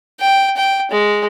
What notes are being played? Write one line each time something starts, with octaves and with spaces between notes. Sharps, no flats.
G5
G5
G#3